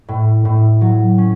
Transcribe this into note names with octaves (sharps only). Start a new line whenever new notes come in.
A2
A2
F#3
C#4